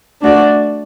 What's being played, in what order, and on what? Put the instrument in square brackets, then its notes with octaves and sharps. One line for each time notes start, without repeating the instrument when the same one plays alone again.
[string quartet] A3 D4 F#4 D5